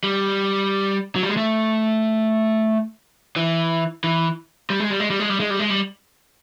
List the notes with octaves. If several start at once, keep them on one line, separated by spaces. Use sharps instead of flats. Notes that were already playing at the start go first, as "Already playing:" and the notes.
G3
F#3
G3
G#3
A3
E3
E3
G3
G#3
G3
G#3
G3
G#3
G3
G#3
G3
G#3
G3